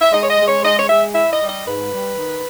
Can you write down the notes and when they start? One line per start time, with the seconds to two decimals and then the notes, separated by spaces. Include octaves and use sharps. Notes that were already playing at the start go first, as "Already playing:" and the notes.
0.01 E5
0.12 G#3 D#5
0.23 C#5
0.29 D#5
0.38 G#3
0.47 C#5
0.63 G#3 D#5
0.77 C#5
0.89 G#3 E5
1.14 E4 E5
1.32 D#5
1.41 G3
1.49 D#5
1.66 G#2 B4
1.92 G3
2.17 D#3